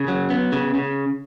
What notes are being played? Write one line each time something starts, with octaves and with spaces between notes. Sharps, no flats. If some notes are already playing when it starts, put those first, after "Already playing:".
Already playing: C#3
F#3
B3
C#3
C#3